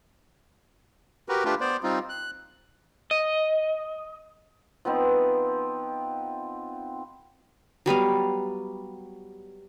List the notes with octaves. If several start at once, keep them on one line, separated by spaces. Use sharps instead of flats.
F#4 G4 A#4 B4
A3 D4 F4 G4 B4
B3 C5 D5
G3 C4 D#4 F4
F#6
D#5
F3 B3 C4 D#4
F#3 G3 B3 F5